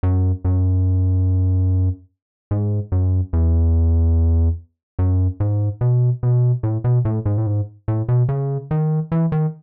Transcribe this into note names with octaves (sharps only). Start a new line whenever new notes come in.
F#2
F#2
G#2
F#2
E2
F#2
G#2
B2
B2
A2
B2
A2
G#2
A2
G#2
A2
B2
C#3
D#3
E3
D#3